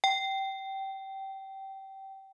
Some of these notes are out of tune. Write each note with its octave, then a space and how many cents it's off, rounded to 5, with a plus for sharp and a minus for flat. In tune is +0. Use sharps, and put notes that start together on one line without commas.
G5 -20